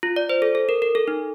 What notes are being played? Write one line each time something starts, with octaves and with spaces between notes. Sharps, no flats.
F4
D5
C5
A4
A4
A#4
A#4
A4
D#4